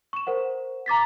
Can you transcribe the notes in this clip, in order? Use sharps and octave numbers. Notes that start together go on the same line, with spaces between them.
C#6 E7
A#4 C5 F#5
A#5 D6 A6 B6